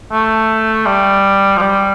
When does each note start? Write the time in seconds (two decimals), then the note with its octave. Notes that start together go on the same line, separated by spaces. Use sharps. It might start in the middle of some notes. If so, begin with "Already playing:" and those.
0.12 A3
0.86 G3
1.57 F3
1.61 G3